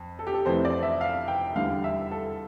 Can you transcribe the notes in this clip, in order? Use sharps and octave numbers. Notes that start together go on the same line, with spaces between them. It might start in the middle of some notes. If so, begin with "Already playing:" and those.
Already playing: F2
A4
G4
A4
F2 E3 A3 C4 E4 C5
D5
E5
F5
G5
E2 D3 G3 F5
E5
A4